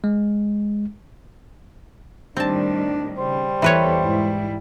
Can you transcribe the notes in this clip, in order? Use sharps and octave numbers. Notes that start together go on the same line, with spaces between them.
G#3
A2 D#3 G3 C4 D4 A5
C#3 G3 C5
E2 E3 B3 A4 B4 C#5
G#2 E4